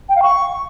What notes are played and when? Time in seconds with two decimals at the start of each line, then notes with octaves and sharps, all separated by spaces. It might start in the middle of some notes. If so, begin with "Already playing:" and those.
0.08 G5
0.15 F5
0.22 C#6